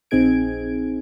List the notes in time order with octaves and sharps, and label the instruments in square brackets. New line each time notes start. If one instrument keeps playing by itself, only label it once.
[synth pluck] A#1 C4 D#4 G#4 G#6 D7